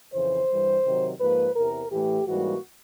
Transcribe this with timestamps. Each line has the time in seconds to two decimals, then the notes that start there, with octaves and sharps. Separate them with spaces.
0.13 F2 C#3 E3 C5
0.50 G2 E3 G3
0.84 C3 D#3 F#3
1.20 G#2 F3 A#3 B4
1.55 E2 C3 E3 A#4
1.91 A2 E3 A3 G4
2.26 G#2 E3 G3 A#3 F#4